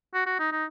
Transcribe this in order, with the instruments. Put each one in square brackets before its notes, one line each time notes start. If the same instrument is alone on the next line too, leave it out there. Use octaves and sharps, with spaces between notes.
[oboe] F#4
F#4
D#4
D#4